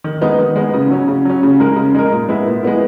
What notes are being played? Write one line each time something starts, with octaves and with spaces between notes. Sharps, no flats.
D#3
G#3 B3 D#4
D#3
G#3 B3 D#4
C#3
F#3 C#4
C#3
F#3 C#4
C#3
G#3 D#4 A#4
C#3
G#3 D#4 A#4
A#2
G#3 B3 E4
A#2
G#3 B3 E4